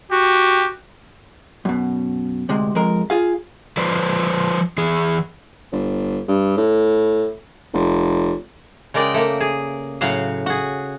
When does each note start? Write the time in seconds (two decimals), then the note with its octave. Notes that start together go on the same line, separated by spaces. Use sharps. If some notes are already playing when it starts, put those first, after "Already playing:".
0.11 F#4 G4
1.65 F#2 B2
2.49 D2 C3 G#3
2.75 F2 G#3 A#4
3.10 F4 G#4 F5
3.77 F3 B4 C5 D5
4.78 E3 G#4
5.72 G1
6.28 G2
6.57 A2
7.74 F1
8.94 C#3 G#3 A#4 D5 G5
9.14 A3 A#3 A#4
9.40 G#4
10.01 A2 C#3 F#3 F#4 F5
10.46 F#4 G#4